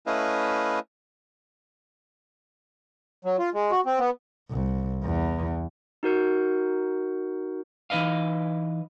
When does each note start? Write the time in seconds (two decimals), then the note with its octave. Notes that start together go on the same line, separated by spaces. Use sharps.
0.07 A3 C#4 E4 B4 D#5 F5
3.25 F#3
3.39 F4
3.54 G#3
3.71 F#4
3.86 C4
3.99 B3
4.51 C2
5.03 E2
6.03 D#4 F#4 A#4 G6 C#7
7.90 E3 D#4 B4 D#5 F5